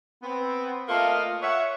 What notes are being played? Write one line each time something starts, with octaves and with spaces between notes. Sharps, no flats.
B3 C4
A3 A#3 F4 A4 D#5 F5
C#5 E5 F#5